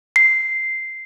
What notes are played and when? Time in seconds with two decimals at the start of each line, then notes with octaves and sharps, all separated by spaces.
0.16 C7